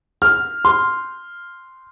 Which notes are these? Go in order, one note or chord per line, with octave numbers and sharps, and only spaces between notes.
F6
C6